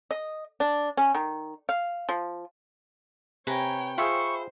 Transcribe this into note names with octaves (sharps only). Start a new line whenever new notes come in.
D#5
D4
C#4
D#3
F5
F3
C3 B4 C#5 G5 G#5 A#5
F4 G#4 C5 E5 G5 B5 C#6